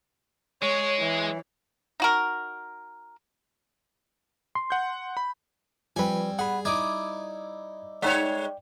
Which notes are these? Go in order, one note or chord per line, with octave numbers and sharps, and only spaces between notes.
G#3 C#5
E3
D#4 F#4 A#4
C6
F#5 G6
B5
F3 G3 C4 B4 G#5
G#4 F#5 B5
D#4 E4 D5 D6 D#6 G#6
G#3 D#4 C#5 D5 G5